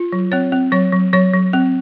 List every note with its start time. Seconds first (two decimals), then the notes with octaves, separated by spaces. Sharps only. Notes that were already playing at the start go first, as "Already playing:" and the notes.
Already playing: F4
0.12 F#3
0.32 C4 C#5
0.52 C4
0.72 F#3 C#5
0.92 F#3
1.13 F#3 C#5
1.33 F#3
1.53 C4